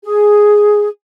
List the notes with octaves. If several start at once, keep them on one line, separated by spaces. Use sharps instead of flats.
G#4